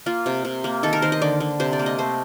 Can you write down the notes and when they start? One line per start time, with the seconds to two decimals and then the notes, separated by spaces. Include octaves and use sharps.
0.06 A#3 F4
0.26 C3
0.45 C3
0.64 A#3
0.83 D#3 A4
0.93 A#4
1.02 D#3 C5
1.12 D#5
1.22 D3 D5
1.40 D3
1.60 C3 C5
1.73 D5
1.79 A#3
1.86 D#5
1.98 A3 C5